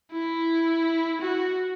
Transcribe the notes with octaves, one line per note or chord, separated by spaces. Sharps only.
E4
F#4